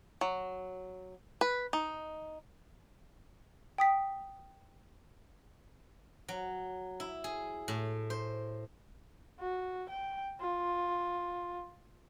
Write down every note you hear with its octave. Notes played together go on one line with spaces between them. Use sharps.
F#3
B4
D#4
G5 D#6 B6
F#3
E4
G#4
A2
C5
F#4
G5
F4